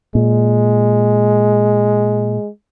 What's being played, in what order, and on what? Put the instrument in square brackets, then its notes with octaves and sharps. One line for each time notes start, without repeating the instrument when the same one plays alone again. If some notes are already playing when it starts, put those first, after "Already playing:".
[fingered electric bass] A#2 [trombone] G#3